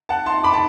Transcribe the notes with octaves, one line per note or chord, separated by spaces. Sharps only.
F#5 A5
A5 C6
B5 D6
A5